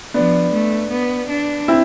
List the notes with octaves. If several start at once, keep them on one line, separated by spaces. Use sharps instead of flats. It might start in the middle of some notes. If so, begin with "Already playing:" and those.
F3 B3 D4
A3
B3
D4
C4 E4